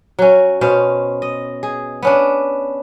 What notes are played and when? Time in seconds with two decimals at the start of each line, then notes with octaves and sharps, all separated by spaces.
0.19 F#3 C#4
0.61 B2 C#4 C5 F5
1.22 D#5
1.63 G#4
2.02 B3 C#4 D4